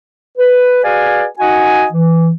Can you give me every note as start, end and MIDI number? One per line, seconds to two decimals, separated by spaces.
0.38 0.82 71
0.84 1.25 66
0.84 1.25 68
0.84 1.25 71
0.84 1.25 74
0.84 1.25 77
0.84 1.25 80
1.39 1.86 63
1.39 1.86 66
1.39 1.86 75
1.39 1.86 78
1.39 1.86 80
1.92 2.31 52